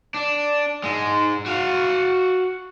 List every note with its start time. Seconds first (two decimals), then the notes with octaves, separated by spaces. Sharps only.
0.14 D4
0.83 G#2 G#3
1.46 F#4 F5